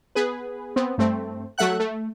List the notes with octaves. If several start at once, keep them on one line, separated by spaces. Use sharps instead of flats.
B3 G#4 B4
B3 C4
G2 A3 C4
F#3 A3 E5 F#5 F#6
A3